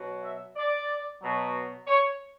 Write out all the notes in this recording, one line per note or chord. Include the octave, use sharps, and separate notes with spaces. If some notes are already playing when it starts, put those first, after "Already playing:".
Already playing: B2 F#3
E5
D5
B2 F#3
C#5